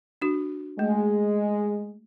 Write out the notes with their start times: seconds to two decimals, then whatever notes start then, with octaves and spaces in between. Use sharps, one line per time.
0.22 D4 F#4
0.79 G#3 A3